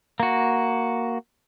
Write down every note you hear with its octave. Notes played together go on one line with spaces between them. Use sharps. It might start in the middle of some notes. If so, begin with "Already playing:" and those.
A#3 F#4